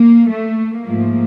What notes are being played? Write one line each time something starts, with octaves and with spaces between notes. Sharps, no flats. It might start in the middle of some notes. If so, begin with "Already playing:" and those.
Already playing: A#3
A3
G#2 F3 A3 A#3